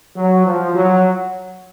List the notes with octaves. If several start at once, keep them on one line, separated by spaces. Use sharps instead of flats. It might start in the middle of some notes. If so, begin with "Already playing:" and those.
F#3
F3
F#3